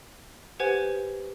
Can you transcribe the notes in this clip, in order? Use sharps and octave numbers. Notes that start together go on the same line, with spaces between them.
G4 B4 C5 F#5 G#5 G#6